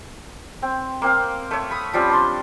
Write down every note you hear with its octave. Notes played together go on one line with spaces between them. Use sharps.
C4
A#3 C4 F5
A3 C#5
B5 D#6
F3 G3 C4 C#4
D4 C6